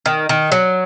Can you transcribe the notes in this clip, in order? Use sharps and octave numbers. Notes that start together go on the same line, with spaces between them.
D#3
D#3
F#3